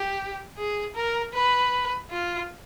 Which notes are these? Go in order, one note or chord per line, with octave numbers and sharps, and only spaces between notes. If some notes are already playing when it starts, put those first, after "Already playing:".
Already playing: G4
G#4
A#4
B4
F4